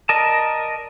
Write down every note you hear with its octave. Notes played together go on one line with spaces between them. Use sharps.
A#4 D5 D#5 A5